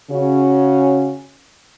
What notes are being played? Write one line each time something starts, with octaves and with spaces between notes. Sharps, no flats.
C#3 C#4 F#4